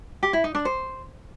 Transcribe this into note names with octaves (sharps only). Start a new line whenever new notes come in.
G4
E4
D#4
D4
C5